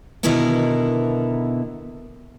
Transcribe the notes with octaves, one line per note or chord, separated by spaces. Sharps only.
B2 D3 D#3 B3 E4 A#4